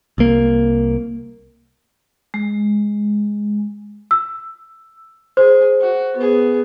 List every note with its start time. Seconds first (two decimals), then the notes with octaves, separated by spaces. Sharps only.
0.18 C2 A#3
2.34 G#3
4.11 E6
5.37 G#4 C5
5.81 F#4
6.16 B3 G#4